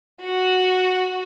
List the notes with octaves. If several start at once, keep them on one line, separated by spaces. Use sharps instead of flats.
F#4